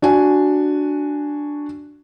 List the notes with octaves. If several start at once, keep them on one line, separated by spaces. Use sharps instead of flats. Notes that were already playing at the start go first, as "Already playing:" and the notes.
D4 F#4 G#5